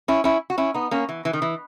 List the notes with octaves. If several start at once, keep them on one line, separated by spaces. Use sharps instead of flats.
C#4 E4
C#4 E4
F#4
C#4 E4
B3 D#4
A#3 C#4
E3
E3
D#3
E3